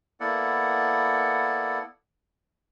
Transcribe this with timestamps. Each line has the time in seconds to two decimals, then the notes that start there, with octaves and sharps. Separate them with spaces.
0.20 A#3 B3 E4 A4 D5 F#5